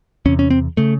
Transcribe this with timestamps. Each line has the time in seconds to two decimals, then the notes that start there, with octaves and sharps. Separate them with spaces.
0.26 E2 C3 C#4
0.39 C#4
0.50 C4
0.77 C#3 A3